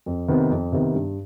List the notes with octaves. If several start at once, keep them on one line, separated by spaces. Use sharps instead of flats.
F2
C3 D#3 B3
F2
C3 D#3 B3
G2